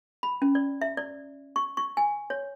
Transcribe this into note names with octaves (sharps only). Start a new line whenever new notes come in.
B5
C#4
D5
E5
D5
C#6
C#6
G#5
C#5